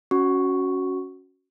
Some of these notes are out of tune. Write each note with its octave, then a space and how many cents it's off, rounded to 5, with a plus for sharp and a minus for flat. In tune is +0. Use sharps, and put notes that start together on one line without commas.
C#4 +0 F#4 +0 C#6 +0